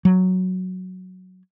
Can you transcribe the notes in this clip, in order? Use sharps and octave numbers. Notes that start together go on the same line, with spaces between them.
F#3